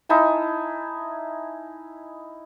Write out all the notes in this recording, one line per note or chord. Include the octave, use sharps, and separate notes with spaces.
D#4 E4 G#5 A5